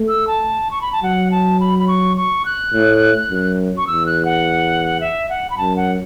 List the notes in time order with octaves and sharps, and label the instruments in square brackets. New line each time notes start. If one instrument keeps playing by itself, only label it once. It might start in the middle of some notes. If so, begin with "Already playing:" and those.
Already playing: [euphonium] A3
[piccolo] E6
A5
C#6
B5
A5
[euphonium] F#3 [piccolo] F#5
[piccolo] A5
B5
B5
C#6
C#6
F#6
[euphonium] A2
F#2
[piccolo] C#6
[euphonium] E2 [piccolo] E6
[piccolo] F#6
F#5
E5
F#5
B5
[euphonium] F#2 [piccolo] A5
[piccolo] F#5